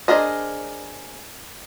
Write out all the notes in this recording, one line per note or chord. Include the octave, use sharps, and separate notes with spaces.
D4 G#4 A#4 C5 D#5